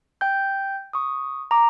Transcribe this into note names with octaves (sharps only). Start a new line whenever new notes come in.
G5 G6
C#6 D#6
A#5 D6